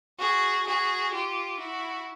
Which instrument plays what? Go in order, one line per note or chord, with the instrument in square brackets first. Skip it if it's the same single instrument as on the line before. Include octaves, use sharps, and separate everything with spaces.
[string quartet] F#4 G#4
F#4 G#4
F4 G4
E4 F#4